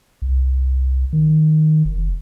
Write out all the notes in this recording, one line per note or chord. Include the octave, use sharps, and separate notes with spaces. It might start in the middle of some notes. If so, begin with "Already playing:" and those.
C2
D#3
F1